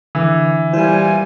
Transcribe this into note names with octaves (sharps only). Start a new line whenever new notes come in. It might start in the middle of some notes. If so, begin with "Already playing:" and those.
D3 E3
A#2 G3 E4 C5 G#5